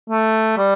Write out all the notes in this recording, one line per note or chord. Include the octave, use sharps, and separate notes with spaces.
A3
G3